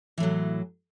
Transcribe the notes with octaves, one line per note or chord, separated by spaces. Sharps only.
A2 E3 F#3